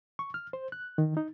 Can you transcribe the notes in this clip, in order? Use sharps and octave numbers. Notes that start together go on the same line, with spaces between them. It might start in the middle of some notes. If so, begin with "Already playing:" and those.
C#6
F6
C5
F#6
D#3
D#4